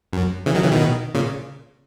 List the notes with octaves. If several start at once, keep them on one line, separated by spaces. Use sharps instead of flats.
F#2
C#3 E3
D#3 F#3
C#3 E3
B2 D#3
A#2 C#3